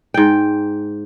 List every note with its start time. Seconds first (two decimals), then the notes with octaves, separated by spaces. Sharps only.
0.14 G#2 G5